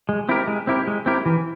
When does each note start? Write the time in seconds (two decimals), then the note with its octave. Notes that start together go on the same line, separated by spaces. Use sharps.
0.09 G#3
0.29 C4 E4 G4 A#4
0.47 G#3
0.67 C4 E4 G4 A#4
0.87 G#3
1.06 C4 E4 G4 A#4
1.26 E3